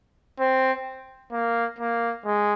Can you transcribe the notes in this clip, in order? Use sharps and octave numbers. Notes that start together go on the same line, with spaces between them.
C4
A#3
A#3
G#3